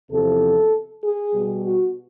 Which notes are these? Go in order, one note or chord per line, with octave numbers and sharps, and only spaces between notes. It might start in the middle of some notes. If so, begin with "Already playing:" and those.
E2 C3 F3 A4
G#4
B2 G3
F#4